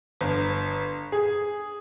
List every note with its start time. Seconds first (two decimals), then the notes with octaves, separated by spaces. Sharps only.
0.21 G1
1.12 G#4